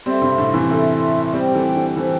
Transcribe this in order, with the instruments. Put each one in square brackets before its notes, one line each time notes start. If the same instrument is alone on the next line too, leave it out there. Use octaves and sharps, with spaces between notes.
[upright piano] G3 C4 [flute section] A4 E5 C6
[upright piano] G2 C3
A2 D3
C3 E3
[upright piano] E3 A3 [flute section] A4 E5 C6
[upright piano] G3 C4 [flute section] G4 C5 G5
[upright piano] E3 A3
D3 G3
[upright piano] E3 A3 [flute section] G4 C5 G5